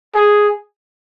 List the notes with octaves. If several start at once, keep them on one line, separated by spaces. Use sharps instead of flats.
G#4